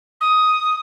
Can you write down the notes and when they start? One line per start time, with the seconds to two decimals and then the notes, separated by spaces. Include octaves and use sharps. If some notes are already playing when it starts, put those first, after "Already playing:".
0.21 D#6